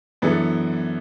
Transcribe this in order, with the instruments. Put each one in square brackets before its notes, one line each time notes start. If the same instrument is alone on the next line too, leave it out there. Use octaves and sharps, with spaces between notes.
[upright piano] F#2 E3 B3 D4 A4